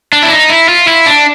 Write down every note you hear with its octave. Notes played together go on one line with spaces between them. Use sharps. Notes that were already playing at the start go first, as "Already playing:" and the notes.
D4
E4
D#4
E4
F4
E4
D4